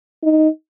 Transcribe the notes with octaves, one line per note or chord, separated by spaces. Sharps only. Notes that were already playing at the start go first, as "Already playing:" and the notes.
D#4